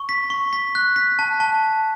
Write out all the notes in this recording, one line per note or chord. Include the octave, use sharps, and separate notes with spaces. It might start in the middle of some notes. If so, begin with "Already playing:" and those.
Already playing: C#6
B6
C#6
B6
F#6
B6
A5
A5